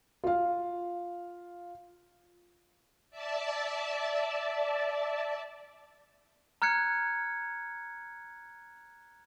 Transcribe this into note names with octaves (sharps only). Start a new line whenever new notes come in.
F4 F5
D5 E5 A5
A#5 F6 F#6 G#6 C#7